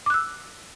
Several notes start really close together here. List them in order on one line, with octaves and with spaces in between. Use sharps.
D6 F#6 E6